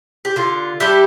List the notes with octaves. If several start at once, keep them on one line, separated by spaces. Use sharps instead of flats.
G4
D3 F4
G3 D4 E4 G4